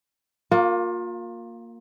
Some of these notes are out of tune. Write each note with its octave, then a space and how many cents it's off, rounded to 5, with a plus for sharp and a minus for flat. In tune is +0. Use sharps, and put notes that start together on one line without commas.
A#3 -5 F4 +30